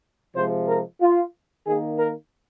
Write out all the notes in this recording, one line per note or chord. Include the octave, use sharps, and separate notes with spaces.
C3 F3 G#3 C5
A#4
F4
D#3 A#3 G#4
A#4